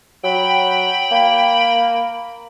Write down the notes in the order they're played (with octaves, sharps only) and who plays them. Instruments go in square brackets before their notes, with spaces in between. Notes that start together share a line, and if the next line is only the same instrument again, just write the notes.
[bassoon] F#3 [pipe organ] G5 B5
[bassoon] A#3